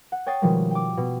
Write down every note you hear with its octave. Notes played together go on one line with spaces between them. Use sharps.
F#5
C#5 G5 D#6 A6 C7
B2 D#3 F3 G3 G#3
G5 D6
B2